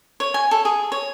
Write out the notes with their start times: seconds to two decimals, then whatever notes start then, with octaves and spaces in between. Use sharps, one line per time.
0.20 C#5
0.34 G#5
0.51 A4
0.65 G#4
0.92 C#5